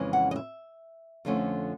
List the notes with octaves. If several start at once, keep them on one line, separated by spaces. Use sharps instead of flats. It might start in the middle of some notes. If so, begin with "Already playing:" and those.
Already playing: F2 C#3 E3 G#3 C#4
F#5
D#5
E5
F2 D3 F3 A3 C#4